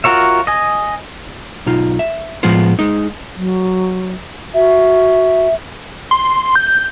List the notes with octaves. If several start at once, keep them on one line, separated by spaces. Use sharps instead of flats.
F4 F#4 A#4 C#5 E5
D#5 G#5
B1 D#4 F4
E5
A2 F3 G#3 B3 F4 C5
G#3 D#4
F#3
F#4 E5
C6
G6